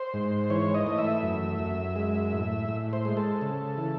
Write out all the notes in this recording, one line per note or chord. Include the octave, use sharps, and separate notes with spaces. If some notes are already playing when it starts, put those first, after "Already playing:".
Already playing: C5
G#2
E3 C#5
D#5
A3
E5
F#2
F#2
G#3
A2
A2
C5
G#3
A4
C#3
E3